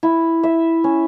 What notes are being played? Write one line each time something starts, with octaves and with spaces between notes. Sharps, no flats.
E4
E5
C#4